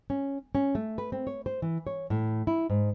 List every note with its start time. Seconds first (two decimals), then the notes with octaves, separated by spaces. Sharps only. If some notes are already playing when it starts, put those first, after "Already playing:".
0.10 C#4
0.55 C#4
0.75 A3
0.98 B4
1.12 C4
1.27 C#5
1.46 C5
1.62 E3
1.87 C#5
2.10 A2
2.47 E4
2.70 G#2